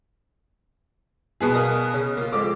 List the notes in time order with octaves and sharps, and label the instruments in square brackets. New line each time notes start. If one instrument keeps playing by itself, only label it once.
[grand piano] B2 B3 G#4
[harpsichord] A#4 D#5 F5
C#3
A#3 F4
[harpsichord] F2 G#2 [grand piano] D6